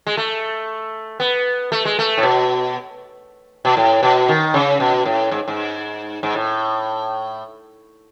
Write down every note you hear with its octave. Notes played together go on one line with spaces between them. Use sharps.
G#3
A3
B3
A3
G#3
A3
A2
B2
B2
A2
B2
D#3
C#3
B2
A2
G#2
G#2
G#2
A2